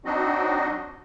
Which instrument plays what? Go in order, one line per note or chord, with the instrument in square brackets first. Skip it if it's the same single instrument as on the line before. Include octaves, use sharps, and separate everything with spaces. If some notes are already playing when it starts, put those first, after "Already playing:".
[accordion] F#3 C4 D4 D#4 F#4 D#5